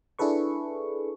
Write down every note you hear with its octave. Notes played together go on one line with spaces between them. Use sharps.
D4 E4 G#4 A4 B4 C#6